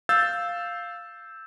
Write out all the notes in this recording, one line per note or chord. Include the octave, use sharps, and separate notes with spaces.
F5 E6 G6 A6